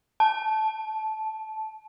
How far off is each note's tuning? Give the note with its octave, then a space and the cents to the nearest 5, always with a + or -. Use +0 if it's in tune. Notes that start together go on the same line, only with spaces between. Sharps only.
A5 -15